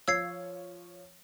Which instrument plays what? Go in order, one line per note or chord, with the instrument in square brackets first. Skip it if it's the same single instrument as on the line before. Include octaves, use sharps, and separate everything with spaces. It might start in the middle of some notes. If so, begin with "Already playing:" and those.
[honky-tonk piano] F3 C#5 F5 [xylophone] E6 G#6 C7